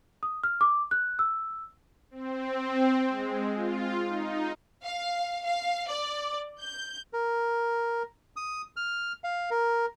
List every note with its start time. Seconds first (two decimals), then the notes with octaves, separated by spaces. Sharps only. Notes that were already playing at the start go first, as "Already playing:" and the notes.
0.23 D#6
0.44 F6
0.61 D6
0.91 F#6
1.19 E6
2.11 C4
3.08 G#3
3.55 F4
4.06 D#4
4.84 F5
5.45 F5
5.88 D5
6.61 G6
7.13 A#4
8.36 D#6
8.76 F6
9.24 F5
9.51 A#4